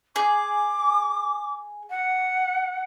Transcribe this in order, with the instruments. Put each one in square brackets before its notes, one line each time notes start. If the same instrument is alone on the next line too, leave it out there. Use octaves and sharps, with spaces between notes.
[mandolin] G#4 [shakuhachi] D6
[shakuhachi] F#5